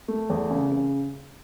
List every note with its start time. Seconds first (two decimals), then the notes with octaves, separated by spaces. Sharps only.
0.08 A3
0.30 E2
0.50 C#3
0.72 C#3